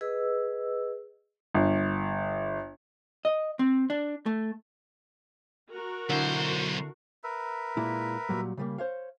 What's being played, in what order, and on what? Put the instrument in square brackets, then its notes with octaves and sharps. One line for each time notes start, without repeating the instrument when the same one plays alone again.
[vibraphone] G#4 B4 D#5 E6
[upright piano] G1
[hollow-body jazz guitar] D#5
C4
D4
A3
[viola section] F#4 A#4
[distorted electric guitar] B1 C5 [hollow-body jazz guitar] D3 E4
[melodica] A#4 B4 E5
[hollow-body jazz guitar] A#2 G#3 E4
A#2 F#3 G3
C#3 G3 A#3
C5 C#5 F5